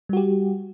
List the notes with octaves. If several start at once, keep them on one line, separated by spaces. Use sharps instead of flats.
G3 F#4 G4